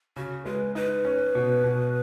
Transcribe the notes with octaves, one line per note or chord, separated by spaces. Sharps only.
C#3 F#4
G#3 B4
D#4 B4
C#4
B2
B2